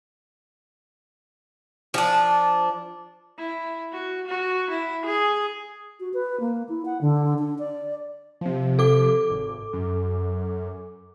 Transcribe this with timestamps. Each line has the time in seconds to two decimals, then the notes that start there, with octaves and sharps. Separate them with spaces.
1.94 F3 D4
3.38 E4
3.92 F#4
4.27 F#4
4.70 E4
5.06 G#4
6.00 F#4
6.13 B4
6.40 A#3
6.69 E4
6.85 F#5
7.01 D3
7.38 D4
7.59 D5
8.41 C3 F3
8.79 A4 D6
9.30 G#1
9.73 F#2